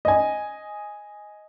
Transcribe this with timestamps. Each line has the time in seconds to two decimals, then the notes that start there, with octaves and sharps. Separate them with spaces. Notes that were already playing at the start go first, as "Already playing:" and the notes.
0.05 D#5 G#5